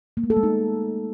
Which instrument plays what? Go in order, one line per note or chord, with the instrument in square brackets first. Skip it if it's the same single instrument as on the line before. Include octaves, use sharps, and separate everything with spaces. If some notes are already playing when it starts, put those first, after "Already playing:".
[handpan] A#3
A3
A4
G#3
D#4